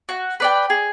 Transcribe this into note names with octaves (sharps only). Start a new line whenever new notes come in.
F#4
B4 D5 G5
G#4